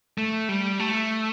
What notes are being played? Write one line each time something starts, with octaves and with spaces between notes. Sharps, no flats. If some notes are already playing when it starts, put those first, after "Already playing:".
A3
G3
A3